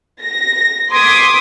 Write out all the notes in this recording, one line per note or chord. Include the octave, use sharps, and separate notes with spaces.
A#6
C6 D6 D#6 G#6 B6